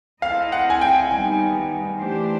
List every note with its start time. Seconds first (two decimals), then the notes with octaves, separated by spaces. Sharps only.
0.22 C4 E4 A4 C5 D#5 F5
0.52 F#5
0.70 G#5
0.81 G5
1.11 D#3 G3 B3 D#4 G#5
2.00 E3 A3 D4 G4 C5